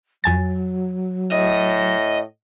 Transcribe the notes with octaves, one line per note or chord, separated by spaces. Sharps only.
F2 F#3 G#5 A6
A2 D#5